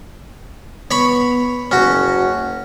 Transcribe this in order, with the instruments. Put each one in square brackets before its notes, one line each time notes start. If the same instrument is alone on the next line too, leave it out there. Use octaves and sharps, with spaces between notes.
[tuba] B3 [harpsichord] C#5 B5 C#6
[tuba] F#1 [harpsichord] C#4 F#4